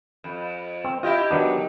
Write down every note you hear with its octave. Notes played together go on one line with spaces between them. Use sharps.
F2
C4
E4 F4 G4 D#5
D#3 F#3 B3 D4